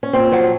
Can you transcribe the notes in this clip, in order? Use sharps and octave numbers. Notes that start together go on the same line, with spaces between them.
C#4
A#2 C4
F3 F#3